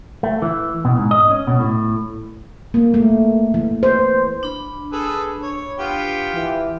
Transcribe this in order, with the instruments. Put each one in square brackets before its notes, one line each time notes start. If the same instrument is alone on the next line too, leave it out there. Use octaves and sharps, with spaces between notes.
[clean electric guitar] A3
E3
B2
G#2
D#5
C#4
B2
A2
[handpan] A#3
A3
E3
C5
[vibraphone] D4 B5
[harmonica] G#4 A4 B4
C#5
B3 F4 G4
[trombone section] E3